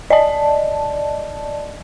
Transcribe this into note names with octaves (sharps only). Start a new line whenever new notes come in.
D5 D#5 A5